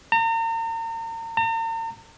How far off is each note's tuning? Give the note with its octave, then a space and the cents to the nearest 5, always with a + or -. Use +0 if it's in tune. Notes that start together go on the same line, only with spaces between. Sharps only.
A#5 -40
A#5 -45